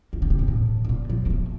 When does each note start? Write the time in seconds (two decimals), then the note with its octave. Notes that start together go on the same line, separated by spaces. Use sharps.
0.13 D#3
0.22 D3
0.30 C3
0.39 A#2
0.48 A2
0.84 C3
0.89 A#2
1.10 F3
1.26 A#3
1.30 A3